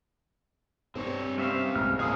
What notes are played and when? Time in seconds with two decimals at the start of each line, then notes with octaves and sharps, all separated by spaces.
0.95 G2 C4 C#5
1.38 G3 C4 C#4 E5 F5
1.76 C2 G#2 F6
1.99 A2 F3 A#3 C4 G#4 F5 D#6 F6